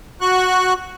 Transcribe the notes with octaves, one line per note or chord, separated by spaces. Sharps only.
F#4 C#6 F#6